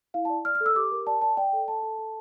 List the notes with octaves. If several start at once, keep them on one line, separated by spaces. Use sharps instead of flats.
E4 F5
A5
D5
D5 F6
F6
A4
E6
G4 D6
A#4
D5 A5
D5 A5
D5 G5
A4
A4 A5
A4
A4